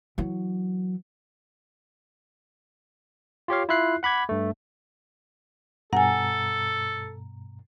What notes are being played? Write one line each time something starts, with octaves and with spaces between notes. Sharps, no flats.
E3 F#3
F4 G4 C#5 F5
E4 F4 E5 F#6 C7
F#5 B5 D6 G#6
G2 A3
G2 B2 A4 F#5 G#5 A#5